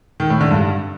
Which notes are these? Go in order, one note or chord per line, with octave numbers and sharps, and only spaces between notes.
D#3
A2
D3
G2